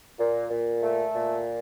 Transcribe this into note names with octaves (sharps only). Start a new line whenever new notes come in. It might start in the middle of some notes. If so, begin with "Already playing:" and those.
A#2
A#2
A3
A#2